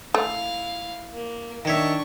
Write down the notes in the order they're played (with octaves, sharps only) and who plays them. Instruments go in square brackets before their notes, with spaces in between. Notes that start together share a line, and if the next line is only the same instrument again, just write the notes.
[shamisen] A3 [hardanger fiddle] E4 F5
[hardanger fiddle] A#3
[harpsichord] D#3 C#5 E5 [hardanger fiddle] D4 C#6